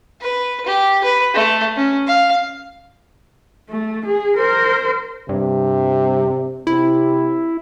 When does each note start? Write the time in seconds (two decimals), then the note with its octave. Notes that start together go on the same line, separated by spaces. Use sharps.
0.21 B4
0.66 G4
1.04 B4
1.34 A3
1.76 C#4
2.07 F5
3.70 A3
4.06 G#4
4.37 A#4 C5
5.29 G2 C3
6.67 C3 E4